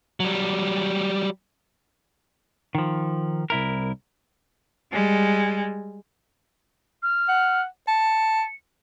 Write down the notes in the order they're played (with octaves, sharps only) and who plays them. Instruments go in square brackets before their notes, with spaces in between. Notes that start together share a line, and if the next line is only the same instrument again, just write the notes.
[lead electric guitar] F#3 G3
[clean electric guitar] D#3 F3
C2 E4 A#4
[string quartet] G3 G#3
[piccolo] F6
[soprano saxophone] F#5
[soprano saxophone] A5 [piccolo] C#7